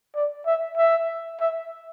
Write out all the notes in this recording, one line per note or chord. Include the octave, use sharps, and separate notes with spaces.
D5
E5
E5
E5